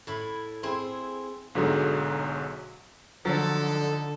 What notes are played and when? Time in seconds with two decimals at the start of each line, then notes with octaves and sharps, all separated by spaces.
0.07 A2 E4 B5
0.63 C4 E4 G#4 C6
1.55 B1 G#2 D3 F#3 F#4 G#4
3.25 D3 F3 F#3 D#4 A4